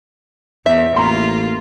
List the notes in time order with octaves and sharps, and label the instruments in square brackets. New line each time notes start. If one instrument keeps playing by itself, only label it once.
[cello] E2 [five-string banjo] E5
[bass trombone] A1 [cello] A#3 F4 [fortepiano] A#5 C6